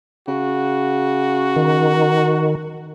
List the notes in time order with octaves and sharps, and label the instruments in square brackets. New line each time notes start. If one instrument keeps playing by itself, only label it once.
[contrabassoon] C#3 [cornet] F#4
[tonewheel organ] D#3